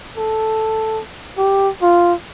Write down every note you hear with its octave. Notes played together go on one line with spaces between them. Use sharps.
A4
G4
F4